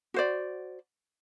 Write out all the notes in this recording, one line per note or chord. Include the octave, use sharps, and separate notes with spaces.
F#4 C5 D5